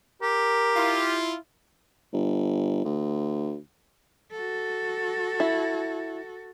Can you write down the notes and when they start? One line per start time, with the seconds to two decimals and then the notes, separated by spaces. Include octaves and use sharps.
0.22 G4 A#4
0.76 E4 F4
2.13 G1
2.85 D2
4.32 F#4 A4
5.40 E4